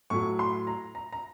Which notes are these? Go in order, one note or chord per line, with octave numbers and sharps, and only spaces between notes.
A2 F#3 C#6
C6
A#5
A#5
A#5